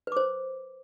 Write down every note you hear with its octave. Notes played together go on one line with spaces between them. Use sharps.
B4 C5 D6